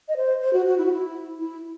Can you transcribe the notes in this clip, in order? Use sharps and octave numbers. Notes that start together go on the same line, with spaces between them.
D#5
C5
C5
F#4
F#4
E4
F#4
E4
E4